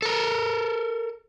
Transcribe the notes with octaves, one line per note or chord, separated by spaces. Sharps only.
A4 A#4